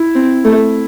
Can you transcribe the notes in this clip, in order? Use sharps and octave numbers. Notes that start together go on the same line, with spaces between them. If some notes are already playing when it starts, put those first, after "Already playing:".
Already playing: E4
C4
A3